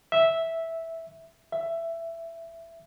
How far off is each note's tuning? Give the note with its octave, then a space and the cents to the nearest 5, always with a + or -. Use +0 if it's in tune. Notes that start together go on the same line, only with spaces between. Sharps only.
E5 -5
E5 +15